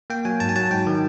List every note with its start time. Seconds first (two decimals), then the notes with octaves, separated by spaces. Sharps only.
0.10 A#3 G5
0.25 F#3 G#5
0.40 G#2 A5
0.49 G#5
0.56 F#3 A5
0.71 G#2 G5
0.87 D#3